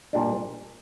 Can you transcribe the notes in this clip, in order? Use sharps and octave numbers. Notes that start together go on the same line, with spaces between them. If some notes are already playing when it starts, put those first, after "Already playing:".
A#2 G3 D4